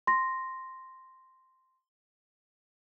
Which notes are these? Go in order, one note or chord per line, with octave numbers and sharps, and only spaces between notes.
C6 A#6